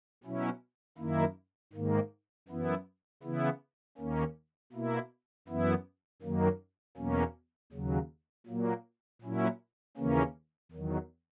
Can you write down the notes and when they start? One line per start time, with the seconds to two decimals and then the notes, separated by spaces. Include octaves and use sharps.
0.24 B2 F#3 C#4 E4
0.98 F#2 D#3 A#3 E4
1.73 G#2 D#3 A#3
2.48 F#2 E3 B3 E4
3.23 C#3 E3 B3 E4
3.98 D#2 D#3 A#3 C#4
4.72 B2 A#3 E4
5.48 F#2 E3 B3 E4
6.22 F#2 D#3 F#3 A#3
6.97 E2 B2 F#3 A#3 C#4
7.72 D#2 C#3 F#3
8.47 A#2 F#3 A#3
9.22 A#2 F#3 C#4 E4
9.97 D#2 C#3 E3 A#3 C#4
10.72 E2 D#3 F#3